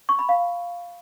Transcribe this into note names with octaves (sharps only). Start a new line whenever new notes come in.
C#6
B5
F5